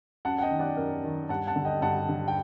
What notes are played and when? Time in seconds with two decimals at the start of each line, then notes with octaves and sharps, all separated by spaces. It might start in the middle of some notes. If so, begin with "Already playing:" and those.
0.25 F#2 F#5 A5
0.38 F#5
0.42 D#5 G5
0.51 D#3
0.59 D5 F#5
0.77 F#2 A#4
1.04 D#3
1.29 G2 F#5 A5
1.47 F#5 A5
1.56 D3
1.65 D#5 G5
1.82 G2 F#5 A5
2.09 D3
2.28 G5